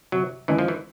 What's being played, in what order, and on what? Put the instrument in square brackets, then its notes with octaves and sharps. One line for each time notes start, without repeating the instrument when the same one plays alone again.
[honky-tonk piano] C3 [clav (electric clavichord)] F#3
[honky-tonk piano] D#3 G#3 C#4 E4 [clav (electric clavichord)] E3
[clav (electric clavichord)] F3
E3